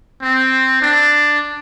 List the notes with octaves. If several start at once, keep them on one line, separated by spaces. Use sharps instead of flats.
C4
D4